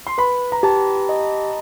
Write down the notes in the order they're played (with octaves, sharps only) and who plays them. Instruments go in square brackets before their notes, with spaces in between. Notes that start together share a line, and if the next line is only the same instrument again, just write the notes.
[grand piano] C6
[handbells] B4 [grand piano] B5
[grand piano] A#5
[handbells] G4 [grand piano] A5
[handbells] D#5